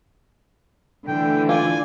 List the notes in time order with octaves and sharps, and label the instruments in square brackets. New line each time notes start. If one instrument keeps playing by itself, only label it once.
[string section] D3 E3 A3 [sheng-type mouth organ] G5
[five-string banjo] F4 [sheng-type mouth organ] D5 G#5